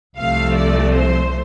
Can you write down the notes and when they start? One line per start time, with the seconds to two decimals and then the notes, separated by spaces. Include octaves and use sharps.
0.18 C2 C3 F3 A3 F5
0.56 D5
0.94 C5